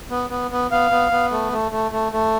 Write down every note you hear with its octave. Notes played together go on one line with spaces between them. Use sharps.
B3
B3
B3
B3 F5
B3
B3
A3
A3
A3
A3
A3